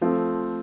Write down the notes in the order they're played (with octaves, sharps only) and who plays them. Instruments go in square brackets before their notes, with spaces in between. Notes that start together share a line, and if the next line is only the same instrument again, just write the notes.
[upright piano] F3 A3 C4 F4